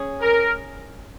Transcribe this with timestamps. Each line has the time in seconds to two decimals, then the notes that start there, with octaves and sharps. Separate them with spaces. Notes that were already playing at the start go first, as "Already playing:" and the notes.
Already playing: C#4 G#4
0.22 A#4